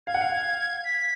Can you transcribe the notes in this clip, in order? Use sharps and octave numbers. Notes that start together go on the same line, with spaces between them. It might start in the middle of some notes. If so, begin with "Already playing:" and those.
F5 G#6
F#5
F5
B6